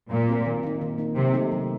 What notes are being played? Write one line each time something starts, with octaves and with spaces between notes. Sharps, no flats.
A#2 F#3
C4 F#4 A#4
D#3
A#3 D#4
D#3
A#3 D#4
C3 F#3
A3 D#4 A4
F#3